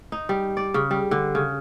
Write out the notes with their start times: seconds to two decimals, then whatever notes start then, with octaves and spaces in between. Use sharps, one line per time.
0.12 D#4
0.29 G3
0.57 D5
0.74 C#3
0.91 G3
1.11 D3
1.35 C#3